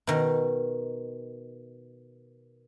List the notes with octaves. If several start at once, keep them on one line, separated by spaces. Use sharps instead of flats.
B2 D#3